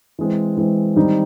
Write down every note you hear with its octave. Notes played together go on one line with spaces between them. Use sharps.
E3 G#3 C4
E3 G#3 C4
D#3 G3 C4 D#4